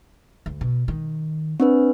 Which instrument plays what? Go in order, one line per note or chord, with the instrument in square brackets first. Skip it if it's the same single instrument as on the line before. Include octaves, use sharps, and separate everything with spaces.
[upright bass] D2
B2
D#3
[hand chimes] C4 D4 B4